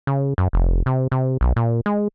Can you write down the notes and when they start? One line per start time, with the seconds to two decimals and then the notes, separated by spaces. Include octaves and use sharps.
0.07 C#3
0.38 F#2
0.53 F1
0.86 C3
1.12 C3
1.41 B1
1.56 A#2
1.86 G#3